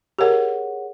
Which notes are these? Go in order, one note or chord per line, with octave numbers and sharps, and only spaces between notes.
G4 G#4 A#4 C#5 F#5